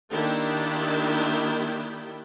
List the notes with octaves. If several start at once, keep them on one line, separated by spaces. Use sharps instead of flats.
D#3 A#3 D4 E4 G4 G5